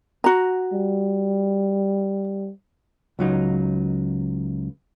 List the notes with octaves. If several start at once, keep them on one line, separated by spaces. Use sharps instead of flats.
F#4 A#5
G3
C#2 F#3 D#4